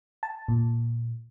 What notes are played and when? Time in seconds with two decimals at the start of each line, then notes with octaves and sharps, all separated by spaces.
0.23 A5
0.48 A#2